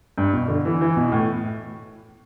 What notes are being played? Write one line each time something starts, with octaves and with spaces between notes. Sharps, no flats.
G2
B2
D3
E3
E3
B2
A2